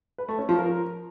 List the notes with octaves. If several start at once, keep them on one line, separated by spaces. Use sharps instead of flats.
B4
A3
C#4
F3
A#4